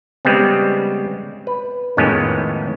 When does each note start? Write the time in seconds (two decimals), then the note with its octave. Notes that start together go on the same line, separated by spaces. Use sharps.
0.25 C#3 G3 G#3 B3 C4
1.47 B4
1.97 F2 A2 D#3 G#3 B3 C#4